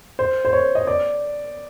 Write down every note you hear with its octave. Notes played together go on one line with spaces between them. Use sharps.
C5
C5
C#5
D#5
D5